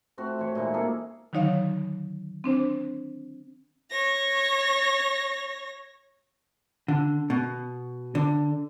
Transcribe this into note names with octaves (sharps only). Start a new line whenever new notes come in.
A3 C4 F#4
E3 C5 C#5
A#2 G#3 D#4 E4
A#3 C4 G#4 A4
D3 D#3 F#3 D#4 C#5 F5
C4 D4 C5
C#5 A#6
D3
B2
D3